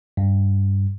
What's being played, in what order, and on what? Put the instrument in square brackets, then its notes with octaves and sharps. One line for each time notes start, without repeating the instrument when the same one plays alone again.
[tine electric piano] G2